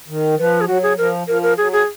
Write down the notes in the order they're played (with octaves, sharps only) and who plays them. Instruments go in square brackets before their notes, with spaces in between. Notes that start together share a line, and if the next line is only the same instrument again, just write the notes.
[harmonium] D#3
[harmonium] F3 [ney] B4
[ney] G#4
[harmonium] F#3 [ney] F#4
[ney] G#4
[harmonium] F3 [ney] A#4
[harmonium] F3 [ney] A#4
[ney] A#4
[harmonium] F#3 [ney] G#4
[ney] G#4